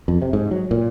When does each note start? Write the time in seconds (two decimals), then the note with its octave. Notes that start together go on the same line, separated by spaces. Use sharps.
0.08 F2
0.22 C3
0.33 G#2
0.51 F#3
0.71 A#2